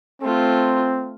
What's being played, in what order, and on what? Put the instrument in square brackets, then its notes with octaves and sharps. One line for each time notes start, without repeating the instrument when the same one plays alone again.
[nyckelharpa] A3 F4 [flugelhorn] C4